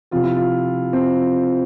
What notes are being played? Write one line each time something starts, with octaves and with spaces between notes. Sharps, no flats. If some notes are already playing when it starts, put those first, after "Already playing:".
C3 F3 F4
E4
F4
C4